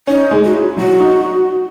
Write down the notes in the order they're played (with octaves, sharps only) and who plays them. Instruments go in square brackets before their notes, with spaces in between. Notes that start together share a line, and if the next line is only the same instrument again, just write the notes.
[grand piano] C#4 [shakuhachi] D#4
[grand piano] G#3
[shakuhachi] F#4
E4
[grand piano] F#3 [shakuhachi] F#4
[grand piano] D#4